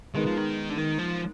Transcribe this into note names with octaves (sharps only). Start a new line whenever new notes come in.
D#3 G#3 B3 D#4 A#4
F3
D#3
D3
D#3
F3